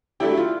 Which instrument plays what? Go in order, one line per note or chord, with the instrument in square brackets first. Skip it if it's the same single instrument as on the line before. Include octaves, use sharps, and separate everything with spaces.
[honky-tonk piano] F#3 A3 D4 G4 [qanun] E4
[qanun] F4